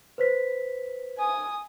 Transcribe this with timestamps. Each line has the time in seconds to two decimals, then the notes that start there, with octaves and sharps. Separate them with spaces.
0.18 B4 C5 B6
1.18 G#5 D#6